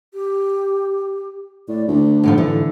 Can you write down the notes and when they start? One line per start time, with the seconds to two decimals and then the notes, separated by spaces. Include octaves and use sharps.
0.14 G4
1.68 A2 D5
1.88 D2 D4
2.24 F#2 A2 F3 D#4
2.38 D3 E3